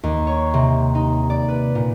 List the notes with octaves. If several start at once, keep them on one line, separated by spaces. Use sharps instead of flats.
D#2
C#5
C3
D#4
D5
B4
A#2